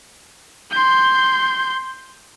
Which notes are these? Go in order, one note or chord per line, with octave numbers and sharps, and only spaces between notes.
C6 G6